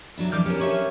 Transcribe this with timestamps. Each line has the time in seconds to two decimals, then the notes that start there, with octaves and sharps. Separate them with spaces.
0.17 F#3 D4 E4
0.32 F2 E3 D5 D6 F6 G6
0.46 C#4 D4 G4 A#4
0.60 C#4 A4 C#5 E5 C#6